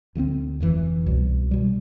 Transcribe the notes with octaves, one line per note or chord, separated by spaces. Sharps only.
D2 D3 A3 C4
F1 F2 E3
C2 B2 G3
B2 G3